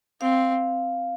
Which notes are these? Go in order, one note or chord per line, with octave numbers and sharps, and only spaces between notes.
C4 F5